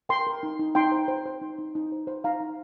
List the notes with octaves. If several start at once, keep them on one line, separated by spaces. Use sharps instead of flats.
A#4 G5 C6
A#4
D#4
D#4
D#4 G5 C6
C5
C5
C5
D#4
D#4
D#4
C5
C5
D#4 F5 A#5
D#4